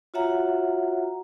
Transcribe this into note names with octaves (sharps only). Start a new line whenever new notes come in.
F4 F#4 C#5 E5 F#5 A#5